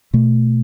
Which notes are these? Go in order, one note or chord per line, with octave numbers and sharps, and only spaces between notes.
B2 A3